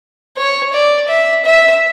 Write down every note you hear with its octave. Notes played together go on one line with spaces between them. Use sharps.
C#5
D5
E5
E5